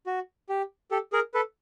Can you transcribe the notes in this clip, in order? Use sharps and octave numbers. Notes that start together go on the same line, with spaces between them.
F#4
G4
G4 A4
G#4 A#4
A4 B4